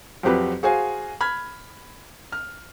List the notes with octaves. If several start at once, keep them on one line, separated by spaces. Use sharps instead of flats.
F2 F#3 C4 G4 B4 B5
F#4 G#4 C5 F5 G#5
B5 F6 G#6
F6